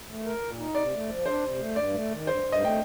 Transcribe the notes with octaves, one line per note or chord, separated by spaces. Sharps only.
A3
A#4
A#2
D#4
C3 D5
A3
F3
D4 C5
C3
A3
G2 D5
A3
D#3
G2 C5
G2
D#5
A3 G5